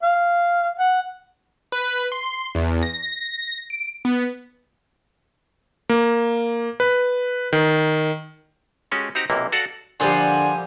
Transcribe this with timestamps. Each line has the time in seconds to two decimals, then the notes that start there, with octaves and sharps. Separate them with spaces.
0.02 F5
0.79 F#5
1.72 B4
2.12 C6
2.55 E2
2.83 A#6
3.70 D7
4.05 B3
5.89 A#3
6.80 B4
7.53 D#3
8.91 G#3 C#4 F#4 G4 A4
9.15 C4 D#4 F#4 G4 A#5
9.30 B1 C3 E3 A#3 E4
9.52 F#4 A4 D5 F5 F#5
10.00 A#2 D3 F3 G3 A4 F#5 G#5 C6